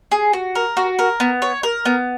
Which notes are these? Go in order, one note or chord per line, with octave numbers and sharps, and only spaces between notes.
G#4
F#4
A#4
F#4
A#4
B3
C#5
A#4
B3